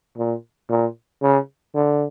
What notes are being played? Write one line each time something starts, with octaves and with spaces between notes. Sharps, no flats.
A#2
A#2
C#3
D3